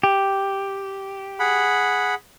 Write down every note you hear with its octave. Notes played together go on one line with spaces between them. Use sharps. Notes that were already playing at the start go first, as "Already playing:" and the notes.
G4
G#4 F#5 B5